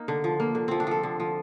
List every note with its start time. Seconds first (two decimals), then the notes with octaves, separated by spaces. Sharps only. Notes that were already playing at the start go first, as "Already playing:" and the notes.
Already playing: A#3 D#4
0.08 D3
0.24 F3
0.40 A#3
0.55 D3
0.68 F3 C4
0.80 D4
0.87 F3 A4
1.03 D3
1.20 F3